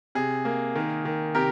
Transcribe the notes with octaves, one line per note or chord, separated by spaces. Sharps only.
C3 G#4
A#3
D#3
D#3
C3 G4 A#4